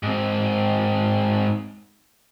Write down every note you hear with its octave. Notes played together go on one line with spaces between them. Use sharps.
G#2 C4